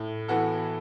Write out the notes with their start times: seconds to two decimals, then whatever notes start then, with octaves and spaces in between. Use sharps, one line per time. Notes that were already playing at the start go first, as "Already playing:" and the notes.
Already playing: A2
0.28 E3 B3 F#4 A4